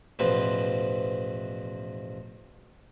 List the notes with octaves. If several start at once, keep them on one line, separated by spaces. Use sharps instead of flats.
A1 E2 B2 F3 B4 C5